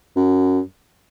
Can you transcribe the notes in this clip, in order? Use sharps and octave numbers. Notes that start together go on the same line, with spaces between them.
F#2